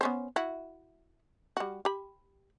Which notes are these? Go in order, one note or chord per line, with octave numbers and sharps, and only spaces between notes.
B3 C#4 C5
E4 F#4
G3 F#4
G4 B5